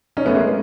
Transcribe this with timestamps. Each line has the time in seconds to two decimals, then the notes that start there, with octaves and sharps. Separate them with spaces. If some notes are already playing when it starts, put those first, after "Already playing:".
0.17 C#4 D#4
0.26 A3 B3
0.35 G#3 A#3